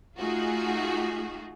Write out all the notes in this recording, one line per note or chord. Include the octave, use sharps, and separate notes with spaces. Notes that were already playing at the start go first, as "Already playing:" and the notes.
A3 D#4 F4 F#4 G#4